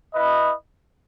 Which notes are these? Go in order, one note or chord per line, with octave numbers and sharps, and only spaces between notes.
E4 B4 D#5